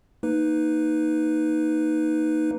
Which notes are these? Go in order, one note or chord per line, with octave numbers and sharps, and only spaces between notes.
A#3 D#4 B4